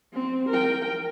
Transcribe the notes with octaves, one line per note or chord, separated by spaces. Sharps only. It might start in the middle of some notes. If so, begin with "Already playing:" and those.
C4
A#4 G5